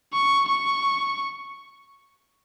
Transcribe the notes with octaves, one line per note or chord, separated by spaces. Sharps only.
C#6
C#6